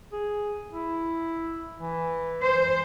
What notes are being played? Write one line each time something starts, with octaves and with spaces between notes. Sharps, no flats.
G#4
E4
E3
C5